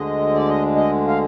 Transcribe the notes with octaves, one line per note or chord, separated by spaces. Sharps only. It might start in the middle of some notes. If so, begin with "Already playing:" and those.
Already playing: D2 D3 G#3 D#5
D5
D#5
D#5
F5